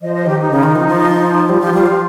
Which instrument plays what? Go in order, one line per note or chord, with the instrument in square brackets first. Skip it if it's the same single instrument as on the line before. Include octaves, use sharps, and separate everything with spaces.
[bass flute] F3 [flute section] C5 D#5
[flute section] C5 D#5
[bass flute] D#3 [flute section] G4
[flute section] D#4
[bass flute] C#3
D#3
F3
F3
[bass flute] G3 [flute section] F4
[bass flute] F3 [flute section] G4
[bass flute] G3 [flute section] F4
[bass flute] F3